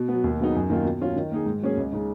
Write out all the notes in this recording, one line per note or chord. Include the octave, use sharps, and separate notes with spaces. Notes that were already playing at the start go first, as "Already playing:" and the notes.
Already playing: B2
F#3 B3
D#2
C#3 F#3 B3 D#4
F#2
D#3 A#3 F4
B2
F#3 C#4 F4
D#3
A#3 D#4 G#4
G#2
F#3 A#3 C#4 G#4
C#2
C#3 G#3 D#4